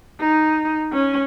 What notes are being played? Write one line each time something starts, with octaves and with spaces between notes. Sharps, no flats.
D#4
C#4